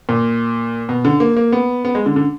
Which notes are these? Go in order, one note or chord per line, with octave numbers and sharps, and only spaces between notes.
A#2
B2
D3
A#3
A#3
B3
B3
G#3
D3
D3